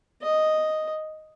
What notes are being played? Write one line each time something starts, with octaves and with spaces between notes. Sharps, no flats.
D#5